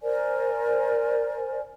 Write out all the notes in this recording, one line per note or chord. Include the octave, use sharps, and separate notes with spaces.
A#4 C5 D5 G#5